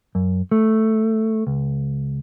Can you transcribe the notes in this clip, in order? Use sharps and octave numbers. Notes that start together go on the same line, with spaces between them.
F#2
A3
C#2